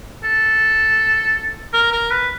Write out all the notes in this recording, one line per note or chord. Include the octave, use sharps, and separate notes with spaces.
A4
A#4
A#4
B4